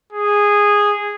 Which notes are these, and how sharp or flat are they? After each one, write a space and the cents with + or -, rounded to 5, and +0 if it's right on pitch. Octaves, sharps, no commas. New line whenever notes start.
G#4 -10